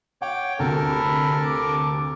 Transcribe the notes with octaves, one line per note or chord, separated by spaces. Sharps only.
C#5 F#5 G5 D6
D2 C3 A4 A#4
B5
D6